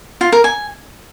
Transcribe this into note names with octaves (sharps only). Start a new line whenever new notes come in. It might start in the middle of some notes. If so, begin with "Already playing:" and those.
F4
A#4
G#5